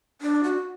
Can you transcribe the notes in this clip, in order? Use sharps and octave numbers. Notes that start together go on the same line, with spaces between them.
D4
F#4